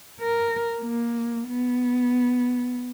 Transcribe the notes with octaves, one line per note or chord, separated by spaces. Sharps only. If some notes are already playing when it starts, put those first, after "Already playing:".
A#4
A#3
B3